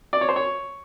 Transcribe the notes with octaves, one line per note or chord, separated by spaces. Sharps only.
D5
C#5
C5
C#5